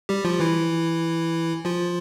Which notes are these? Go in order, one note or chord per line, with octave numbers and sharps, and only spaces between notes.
G3 G4
F3 F4
E3 E4
F3 F4